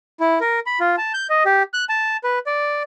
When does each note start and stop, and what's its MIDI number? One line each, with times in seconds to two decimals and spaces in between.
0.20 0.39 64
0.41 0.60 70
0.66 0.79 83
0.80 0.96 65
0.98 1.13 81
1.14 1.27 91
1.30 1.43 75
1.45 1.63 67
1.74 1.85 90
1.89 2.17 81
2.24 2.39 71
2.47 2.83 74